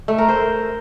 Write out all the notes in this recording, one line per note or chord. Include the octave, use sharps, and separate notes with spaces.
A3
A#4
C5